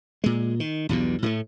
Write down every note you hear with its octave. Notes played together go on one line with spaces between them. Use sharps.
A#2 G#3
D#3
B1 E2 G2 B2
A2 G#3 A3